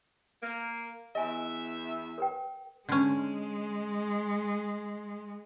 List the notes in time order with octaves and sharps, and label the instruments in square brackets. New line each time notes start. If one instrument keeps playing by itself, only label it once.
[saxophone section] A#3
[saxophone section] E2 E5 [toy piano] D#5 G#5
[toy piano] A#4 B4 G5
[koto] D3 C#4 [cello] G#3